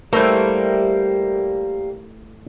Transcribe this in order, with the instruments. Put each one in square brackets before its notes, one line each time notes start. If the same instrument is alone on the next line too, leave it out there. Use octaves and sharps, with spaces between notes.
[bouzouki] G3 A#3 [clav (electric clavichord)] A3 E4 [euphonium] G4 [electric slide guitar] A4 A#4 C5